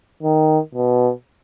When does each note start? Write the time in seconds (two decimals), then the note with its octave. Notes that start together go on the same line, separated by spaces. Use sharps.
0.23 D#3
0.75 B2